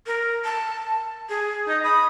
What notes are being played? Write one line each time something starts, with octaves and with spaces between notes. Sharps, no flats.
A#4
A5
G#4
D#4 D#5
B5 D#6